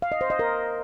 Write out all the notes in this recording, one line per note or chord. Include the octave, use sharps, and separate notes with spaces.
F5
D#5
C5
D#5
A#4